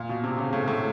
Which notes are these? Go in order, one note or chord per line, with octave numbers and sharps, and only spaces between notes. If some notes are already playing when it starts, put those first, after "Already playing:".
Already playing: A#2
B2
C3
C#3
A2
A2